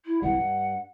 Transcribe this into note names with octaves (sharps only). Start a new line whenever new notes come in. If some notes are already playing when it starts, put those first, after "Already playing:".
E4
C2 E3 G3 F#5
G2